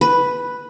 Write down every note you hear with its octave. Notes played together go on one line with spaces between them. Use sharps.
B4